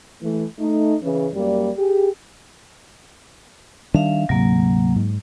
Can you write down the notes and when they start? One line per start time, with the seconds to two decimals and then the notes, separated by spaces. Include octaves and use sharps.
0.21 E3 A3
0.59 A3 D#4
1.02 C#3 E3
1.33 F#2 G3 A#3 D5
1.76 G4 G#4
3.94 D#3 G3 D4 E5 F5
4.29 D2 G#2 C3 F#3 A#3
4.96 G#2